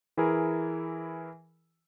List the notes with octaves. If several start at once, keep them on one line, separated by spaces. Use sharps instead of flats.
E3 E4 G#4 A#4